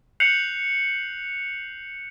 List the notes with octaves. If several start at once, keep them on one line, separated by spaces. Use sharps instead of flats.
F#6 G6 C7 C#7 F7 F#7